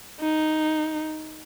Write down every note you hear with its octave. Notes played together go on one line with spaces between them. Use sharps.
D#4